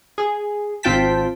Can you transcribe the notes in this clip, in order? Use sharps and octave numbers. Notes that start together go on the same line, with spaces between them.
G#4
G#1 C4 F4 G5 A5 B6